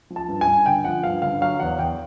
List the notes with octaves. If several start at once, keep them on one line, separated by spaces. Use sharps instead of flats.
F3
A5
G2
G#5
G2
D3 G5
F3 F#5
G2 F5
D3 F5
F#3 F5
E2 F#5
E2 G5